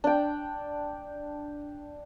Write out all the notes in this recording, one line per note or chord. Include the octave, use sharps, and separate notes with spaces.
D4 G5